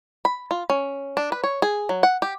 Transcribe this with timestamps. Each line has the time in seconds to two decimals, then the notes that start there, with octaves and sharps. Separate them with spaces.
0.25 B5
0.51 F4
0.70 C#4
1.17 D4
1.32 B4
1.44 C#5
1.62 G#4
1.89 F#3
2.03 F#5
2.22 G4